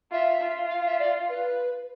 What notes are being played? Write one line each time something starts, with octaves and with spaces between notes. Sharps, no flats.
F4 E5
F4
F5
E5
D5
B4